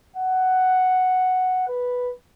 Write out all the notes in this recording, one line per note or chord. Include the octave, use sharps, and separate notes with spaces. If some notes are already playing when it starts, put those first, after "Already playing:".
F#5
B4